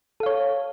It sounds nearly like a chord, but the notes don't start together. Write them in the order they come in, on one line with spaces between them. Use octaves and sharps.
A4 F5 C#5